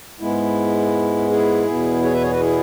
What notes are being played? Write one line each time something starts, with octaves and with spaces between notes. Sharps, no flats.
G#2 G#3 B3 E4
E4 G#4
E2 B2 B3
G#4 C#5
B4 E5
G#4 C#5
F#4 B4
E4 G#4